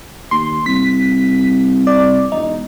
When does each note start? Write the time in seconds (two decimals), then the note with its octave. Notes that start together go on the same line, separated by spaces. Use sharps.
0.31 D#2 C6
0.66 C2 B6
1.87 D5
2.32 E1 D#4